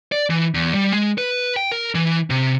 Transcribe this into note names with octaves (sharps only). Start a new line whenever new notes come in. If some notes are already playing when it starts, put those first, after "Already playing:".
D5
E3
E2
G3
G#3
B4
G5
A#4
E3
C3